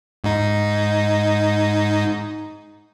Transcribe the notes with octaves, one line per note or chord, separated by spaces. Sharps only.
G#2 D#4